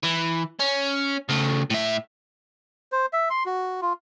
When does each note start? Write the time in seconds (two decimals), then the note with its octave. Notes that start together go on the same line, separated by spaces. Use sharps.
0.04 E3
0.59 C#4
1.29 C#3 A3
1.70 A2 E5
2.92 C5
3.13 E5
3.30 C6
3.46 F#4
3.82 F4